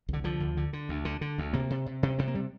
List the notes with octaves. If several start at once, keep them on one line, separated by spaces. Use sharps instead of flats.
C2 D3
D3 F3
D2
D3
D3
D2
D3
D3
D2
C3 A#3
C3
C3
C3
C3 C4
A#3
C3 G3